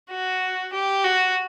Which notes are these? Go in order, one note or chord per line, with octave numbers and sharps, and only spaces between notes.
F#4
G4
F#4